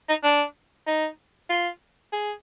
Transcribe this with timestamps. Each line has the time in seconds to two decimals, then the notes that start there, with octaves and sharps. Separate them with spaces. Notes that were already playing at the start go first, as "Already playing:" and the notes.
0.09 D#4
0.23 D4
0.87 D#4
1.49 F4
2.13 G#4